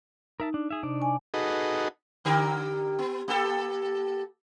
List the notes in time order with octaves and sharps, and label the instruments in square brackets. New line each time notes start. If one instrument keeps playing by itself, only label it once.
[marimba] D#4 [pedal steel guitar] A#4 E5 A5
[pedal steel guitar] D4
G#4 E5
[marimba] C3 [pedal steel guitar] D4 D#4 D5
[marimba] G#5 C#6
[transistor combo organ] D#4 F#4 G#4 A4 B4 D#5
[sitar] D3 G4 A#4
B3
A#3 G4 A4